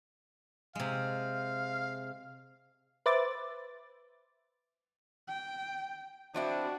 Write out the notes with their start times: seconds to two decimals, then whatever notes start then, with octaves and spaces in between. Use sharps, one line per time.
0.75 C3 G#3 F5
3.06 B4 C5 E5 D6 A6
5.28 G5
6.34 F3 C4 D4 E4 F#4